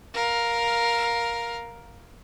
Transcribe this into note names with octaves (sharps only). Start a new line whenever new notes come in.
A#4 F5